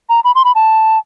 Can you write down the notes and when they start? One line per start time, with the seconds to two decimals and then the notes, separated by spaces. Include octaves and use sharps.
0.09 A#5
0.24 B5
0.35 C6
0.45 B5
0.55 A5